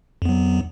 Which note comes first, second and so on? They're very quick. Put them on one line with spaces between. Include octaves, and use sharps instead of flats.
F2 B3 F#3